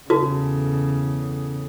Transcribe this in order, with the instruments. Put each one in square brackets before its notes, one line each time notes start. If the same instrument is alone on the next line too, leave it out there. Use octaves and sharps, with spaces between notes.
[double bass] E2 C#3 [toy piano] F#4 [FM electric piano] A4